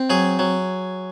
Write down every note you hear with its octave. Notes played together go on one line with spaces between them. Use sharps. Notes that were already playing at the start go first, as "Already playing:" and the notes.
Already playing: C4
F#3 G#4
F#3